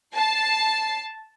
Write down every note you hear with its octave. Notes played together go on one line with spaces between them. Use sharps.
A5 C7